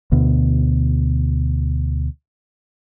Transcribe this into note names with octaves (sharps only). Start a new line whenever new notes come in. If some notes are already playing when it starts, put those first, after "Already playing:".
D2 B2